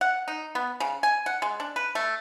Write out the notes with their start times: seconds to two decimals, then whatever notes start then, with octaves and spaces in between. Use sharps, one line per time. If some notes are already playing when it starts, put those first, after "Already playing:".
0.01 F#5
0.28 D#4
0.55 B3
0.80 C#3
1.03 G#5
1.26 F#5
1.42 G#3
1.60 D4
1.76 B4
1.95 A3